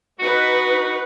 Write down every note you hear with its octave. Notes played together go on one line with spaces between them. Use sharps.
D#4 F#4 B4